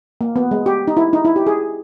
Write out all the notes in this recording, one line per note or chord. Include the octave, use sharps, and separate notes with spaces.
A#3
B3
G#3
G4
D#4
E4
D#4
E4
G4
G#4